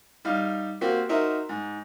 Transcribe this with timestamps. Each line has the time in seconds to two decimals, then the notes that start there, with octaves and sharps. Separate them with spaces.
0.25 G3 D#4 F5
0.81 A#3 C4 F#4 G4
1.09 D#4 F#4 A#4 C5 E5
1.49 G#2